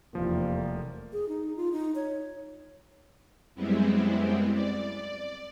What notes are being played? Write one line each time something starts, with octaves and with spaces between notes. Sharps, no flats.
F1 E2 E3 F3 G3 A3 A#3
G#4
D#4
F4
D#4
C#5
F#2 G3 G#3 B3 C4 E4
D5